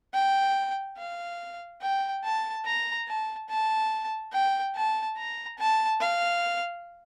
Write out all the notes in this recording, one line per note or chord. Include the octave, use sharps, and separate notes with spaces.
G5
F5
G5
A5
A#5
A5
A5
G5
A5
A#5
A5
F5